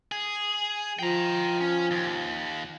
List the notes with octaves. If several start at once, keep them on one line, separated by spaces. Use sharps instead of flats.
G#4
F3 G5 A#5
C#4
D#2